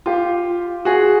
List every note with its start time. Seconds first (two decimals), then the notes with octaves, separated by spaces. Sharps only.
0.06 F4 G4
0.85 F#4 G#4